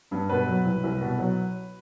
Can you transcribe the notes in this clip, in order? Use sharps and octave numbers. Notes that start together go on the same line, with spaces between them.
G2
B2 B4
F#3
C2
C2
B2
F#3